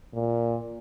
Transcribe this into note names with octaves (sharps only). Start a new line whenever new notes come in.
A#2